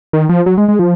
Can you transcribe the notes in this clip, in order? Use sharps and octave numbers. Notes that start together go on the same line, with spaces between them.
D#3
F3
F#3
G#3
G#3
F3